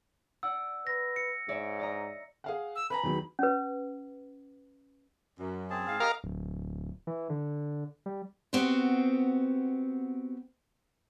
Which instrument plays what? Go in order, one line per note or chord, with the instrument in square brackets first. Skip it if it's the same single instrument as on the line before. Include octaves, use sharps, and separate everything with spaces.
[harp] D5 F#5 [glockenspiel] E6
[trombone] B4 [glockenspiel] A#6
[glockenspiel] C#7
[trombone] G#2 [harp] C#5 D5 E5
[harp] D5 D#5 A#5
[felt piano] G#4 F5 F#5
[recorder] E6
[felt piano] B4 G#5 A#5 [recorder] B5
[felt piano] E2 D#3 F#3
[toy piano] C#4 B4
[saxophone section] F#2
[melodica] C4 G#4 A5
[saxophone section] G#2 F5
[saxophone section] G4 D#5 [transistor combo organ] A#4 F5
[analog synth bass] D1
E3
D3
G3
[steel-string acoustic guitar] B3 C4 F#4 G4 C5